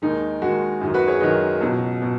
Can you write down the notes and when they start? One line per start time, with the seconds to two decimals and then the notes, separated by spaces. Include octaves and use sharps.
0.02 D#2 D#3 G#3 D#4
0.42 D#2 D#3 G#3 F#4
0.81 F#2 D#3 F#3
0.94 F#4 B4
1.08 G#4 C#5
1.21 F#2 D#3 F#3 B4 D#5
1.61 C#2 B2 F#3
2.02 B2